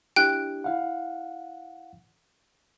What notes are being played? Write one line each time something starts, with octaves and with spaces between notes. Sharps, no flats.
D4 E4 G4 G5 F#6
E4 F5 F#5